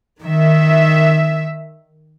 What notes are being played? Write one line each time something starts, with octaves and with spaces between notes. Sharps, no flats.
D#3 E5